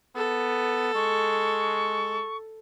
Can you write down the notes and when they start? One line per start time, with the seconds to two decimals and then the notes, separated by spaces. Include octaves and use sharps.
0.16 B3 A4
0.95 G#3 C#6